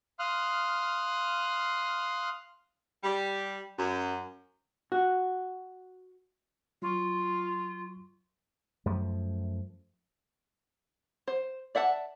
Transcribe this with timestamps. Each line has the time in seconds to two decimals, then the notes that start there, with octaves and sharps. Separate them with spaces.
0.19 F5 C6 D#6 F6 F#6
3.03 G3
3.78 F#2
4.92 F#4
6.82 F#3 F4 C#6
8.86 F#2 F3 A3
11.28 C5
11.75 D5 E5 F#5 A5